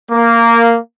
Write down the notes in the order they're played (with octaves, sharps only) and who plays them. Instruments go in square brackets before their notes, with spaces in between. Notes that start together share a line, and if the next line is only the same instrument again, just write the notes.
[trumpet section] A#3